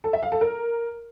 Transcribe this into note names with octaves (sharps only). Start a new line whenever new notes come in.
A4
E5
F5
A4
A#4